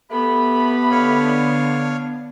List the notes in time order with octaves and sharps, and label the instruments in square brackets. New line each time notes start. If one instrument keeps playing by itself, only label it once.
[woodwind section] A3 G4 B5 [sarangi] B3
[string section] D3 D4 [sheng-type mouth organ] C#5 F5